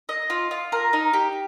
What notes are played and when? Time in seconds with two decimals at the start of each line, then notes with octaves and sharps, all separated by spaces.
0.09 D#5
0.30 F4
0.51 F4
0.72 A#4
0.93 D#4
1.13 G4